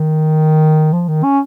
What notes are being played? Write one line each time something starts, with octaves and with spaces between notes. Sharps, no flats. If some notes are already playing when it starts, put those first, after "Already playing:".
Already playing: D#3
F3
D#3
C#4